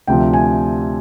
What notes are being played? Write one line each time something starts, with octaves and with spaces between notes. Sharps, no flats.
D2 C3 F3 G5
G#5